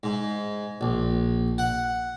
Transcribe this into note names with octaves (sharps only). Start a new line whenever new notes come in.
G#2
A#1
F#5